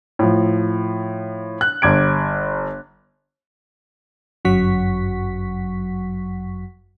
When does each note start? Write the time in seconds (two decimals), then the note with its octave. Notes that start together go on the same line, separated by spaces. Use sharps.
0.19 A2 F3
1.61 F#6
1.82 G1 D6 G#6 D7
4.45 G1 F#2 F#3 F#5 C#6 B6